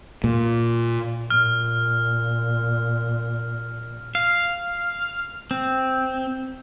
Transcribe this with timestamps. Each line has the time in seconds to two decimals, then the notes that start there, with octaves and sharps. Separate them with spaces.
0.24 A#2
1.30 A#2 F6
4.15 F5
5.51 C4